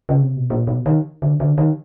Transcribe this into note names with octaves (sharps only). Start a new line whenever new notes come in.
C#3
C3
B2
A#2
B2
D#3
D3
D3
D#3